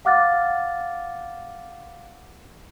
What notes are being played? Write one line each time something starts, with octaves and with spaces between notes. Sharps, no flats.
F5 F#5 D6 F6 F#6 A6